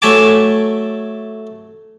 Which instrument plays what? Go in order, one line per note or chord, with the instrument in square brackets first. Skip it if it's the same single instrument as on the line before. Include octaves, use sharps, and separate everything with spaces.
[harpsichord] F#3 A3 E5 G#5 A5 D6